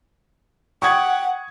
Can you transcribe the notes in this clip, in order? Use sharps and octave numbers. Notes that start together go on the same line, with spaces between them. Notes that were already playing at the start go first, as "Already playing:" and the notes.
F#5 G5 C#6 D#6 G#6